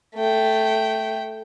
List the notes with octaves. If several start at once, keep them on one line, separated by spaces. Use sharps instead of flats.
A3 G5